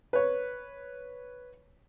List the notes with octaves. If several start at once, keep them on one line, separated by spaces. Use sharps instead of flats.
B4 C#5